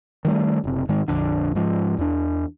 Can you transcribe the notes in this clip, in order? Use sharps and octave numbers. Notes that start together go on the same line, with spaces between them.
D#3 G3 A3
F#1 C3
G#2 D#3 G#3
A#1 F2 D3
G#2 F3
E2 D4